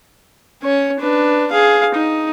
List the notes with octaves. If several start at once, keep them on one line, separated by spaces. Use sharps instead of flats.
C#4 C#5
D4 B4
G#4 F5
D#4